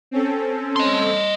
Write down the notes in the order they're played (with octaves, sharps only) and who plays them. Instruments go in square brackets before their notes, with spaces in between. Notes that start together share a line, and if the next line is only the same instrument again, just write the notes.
[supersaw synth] C4 C#4 A4
[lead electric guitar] D#5 C6